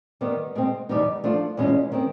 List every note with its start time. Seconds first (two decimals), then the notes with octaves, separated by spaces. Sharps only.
0.21 D#3 G3 B3
0.55 B2 G#3 C4
0.89 E2 B2 G3 B3 D#4
1.24 F3 A3 D4 F4
1.57 E2 B2 G#3 C#4 F4
1.92 D#3 G#3 C4